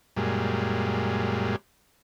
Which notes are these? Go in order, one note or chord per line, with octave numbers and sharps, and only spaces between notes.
F#2 A#2 G3 G#3